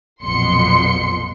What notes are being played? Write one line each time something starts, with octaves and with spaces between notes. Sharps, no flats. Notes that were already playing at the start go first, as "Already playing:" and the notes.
A#1 F2 B2 F#3 C6 C#7